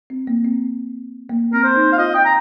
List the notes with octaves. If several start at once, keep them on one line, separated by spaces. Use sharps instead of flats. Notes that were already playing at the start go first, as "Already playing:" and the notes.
C4
A#3
C4
A#3
C4 A#4
C5
D#4
F5
F4 D#5
G5
A#5